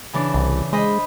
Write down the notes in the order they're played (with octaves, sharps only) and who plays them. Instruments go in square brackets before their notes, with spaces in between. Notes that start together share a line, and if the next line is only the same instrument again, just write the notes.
[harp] C#3 E3 D4
[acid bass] C2
[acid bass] G#3 [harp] C5 D#5 B5